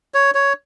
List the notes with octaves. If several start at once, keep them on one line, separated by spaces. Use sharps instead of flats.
C#5
C#5